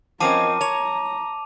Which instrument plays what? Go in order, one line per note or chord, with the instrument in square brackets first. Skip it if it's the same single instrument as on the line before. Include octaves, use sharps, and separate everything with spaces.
[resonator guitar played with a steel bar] F3 C4 C#4 [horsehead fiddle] A#4 D#5 [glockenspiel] A5 D6 D#7
[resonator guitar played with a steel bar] C#5 [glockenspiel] A5 F7 [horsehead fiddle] A#5